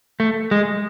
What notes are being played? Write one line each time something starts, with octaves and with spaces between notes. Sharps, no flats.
A3
G#3